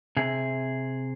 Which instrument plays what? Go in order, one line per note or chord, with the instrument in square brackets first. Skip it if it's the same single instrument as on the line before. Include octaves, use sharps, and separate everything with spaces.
[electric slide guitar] C3 G#4